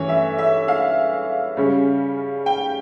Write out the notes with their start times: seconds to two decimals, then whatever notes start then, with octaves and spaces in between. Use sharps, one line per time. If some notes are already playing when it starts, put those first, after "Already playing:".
Already playing: G2 E3 A3 C#4 C#5
0.09 E5
0.38 E5
0.68 F5
1.57 C#3 G3 C#4
2.46 G5